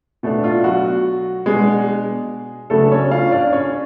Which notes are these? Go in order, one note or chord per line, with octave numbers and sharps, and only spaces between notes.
B2 A3 D4
F4
F#3 F#4
B2 G#3 D4 G#4
C#3 F#3 A3 B3 D4 A4
C#4 C#5
F4 F5
D4 D5
C#4 C#5